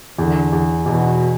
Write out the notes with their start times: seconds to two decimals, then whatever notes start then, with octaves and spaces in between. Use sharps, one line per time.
0.19 E2 D3
0.53 E2
0.86 E2 B2